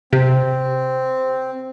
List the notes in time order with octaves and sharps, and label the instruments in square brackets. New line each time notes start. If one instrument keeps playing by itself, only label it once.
[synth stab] C3 [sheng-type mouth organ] C4